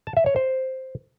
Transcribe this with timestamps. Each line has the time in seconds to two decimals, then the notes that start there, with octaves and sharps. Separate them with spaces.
0.07 A5
0.17 E5
0.26 C#5
0.36 C5